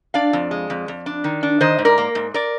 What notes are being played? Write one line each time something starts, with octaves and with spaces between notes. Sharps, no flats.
D4 D5 F5
F2
G#3
F2
F2
D4
D#3
D4
D#3 C5 D#5
G#2
A#4 D5
A#3
G#2
A#4 D5